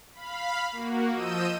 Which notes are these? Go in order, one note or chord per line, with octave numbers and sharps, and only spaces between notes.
F5 B5
A#3 F#4
F3 D#5 E6 G6 D#7